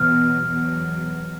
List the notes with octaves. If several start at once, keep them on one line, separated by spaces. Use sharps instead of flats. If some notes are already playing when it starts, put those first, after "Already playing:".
Already playing: E2 B2 F#3 F6
E2 B2 F#3